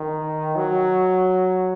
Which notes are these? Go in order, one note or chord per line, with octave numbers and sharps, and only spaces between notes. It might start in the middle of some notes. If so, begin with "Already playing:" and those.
Already playing: D#3
F#3